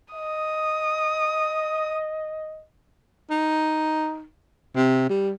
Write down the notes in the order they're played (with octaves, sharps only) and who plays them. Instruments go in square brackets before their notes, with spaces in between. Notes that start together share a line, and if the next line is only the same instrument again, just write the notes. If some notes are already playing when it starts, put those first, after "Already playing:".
[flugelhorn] D#5 [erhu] D#6
[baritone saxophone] D#4
C3
G3